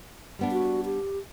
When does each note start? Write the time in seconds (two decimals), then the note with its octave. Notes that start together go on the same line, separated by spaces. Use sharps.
0.39 G3 B3 D4
0.52 F#4
0.85 G4